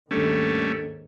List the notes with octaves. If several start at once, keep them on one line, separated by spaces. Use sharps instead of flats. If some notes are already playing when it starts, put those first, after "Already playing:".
D#2 G#2 D#3 G3 A3 C#4 D4 A4